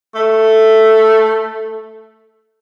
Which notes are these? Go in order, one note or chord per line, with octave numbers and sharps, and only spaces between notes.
A3